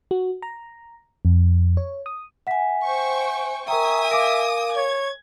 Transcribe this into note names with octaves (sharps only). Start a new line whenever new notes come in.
F#4
A#5
F2
C#5
D#6
E5 F#5 G#5 B6
C5 G5 C#6
A#4 E5 G5 G#5 A#5 C#6 D#6
A#4 F5 D6 D7
C#5 G#6